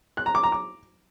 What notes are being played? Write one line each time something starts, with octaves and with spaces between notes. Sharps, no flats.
F#6
A#5
D6
A#5
D6